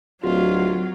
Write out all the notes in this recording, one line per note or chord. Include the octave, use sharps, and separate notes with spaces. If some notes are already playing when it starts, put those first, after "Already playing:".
D1 F#3 F4 F#4